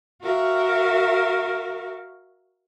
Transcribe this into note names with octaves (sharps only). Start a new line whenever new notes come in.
F#4 A#4 E5 F5